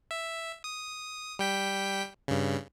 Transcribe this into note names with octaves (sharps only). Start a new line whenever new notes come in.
E5
D#6
G3 G5 B6
G2 C#3